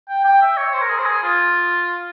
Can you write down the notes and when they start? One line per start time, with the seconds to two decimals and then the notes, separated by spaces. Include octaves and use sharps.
0.09 G5
0.24 G5
0.42 E5
0.57 C#5
0.73 C5
0.81 A#4
0.89 G#4
0.99 C5
1.06 G#4
1.23 F4